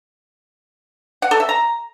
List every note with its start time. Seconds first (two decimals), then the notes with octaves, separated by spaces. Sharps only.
1.22 F#5
1.31 A4
1.40 E5
1.49 A#5